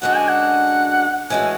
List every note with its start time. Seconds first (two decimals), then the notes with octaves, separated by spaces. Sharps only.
0.02 F#2 D3 G#3 D4 F#4 F#5
0.16 G#5
0.29 F#5
1.30 A2 E3 G#3 C#4 F#4 G#5